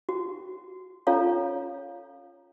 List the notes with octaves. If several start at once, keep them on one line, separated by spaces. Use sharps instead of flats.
F#4
C#4 F4 A4 C#5 F5 A#5